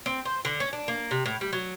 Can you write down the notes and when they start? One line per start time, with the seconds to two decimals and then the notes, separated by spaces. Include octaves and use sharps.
0.06 C4
0.25 C5
0.45 D3
0.60 C#4
0.73 D4
0.88 A#3
1.11 C3
1.26 A2
1.41 G3
1.53 F#3